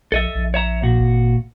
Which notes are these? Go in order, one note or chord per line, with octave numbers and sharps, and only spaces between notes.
A#1 A4 D#5 E5
A#1
C#5 E5 A#5
A#2 F#4
G#1